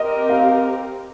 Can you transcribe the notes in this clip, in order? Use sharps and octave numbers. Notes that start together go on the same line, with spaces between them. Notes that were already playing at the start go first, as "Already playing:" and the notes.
Already playing: C4 G4 A#4 D#5
F5